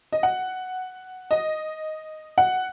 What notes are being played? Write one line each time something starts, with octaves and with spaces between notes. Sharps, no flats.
D#5
F#5
D#5
F#5